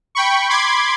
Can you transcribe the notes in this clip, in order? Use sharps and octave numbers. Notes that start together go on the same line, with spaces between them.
G5 B5 C#6
B5 C6 D6 G#6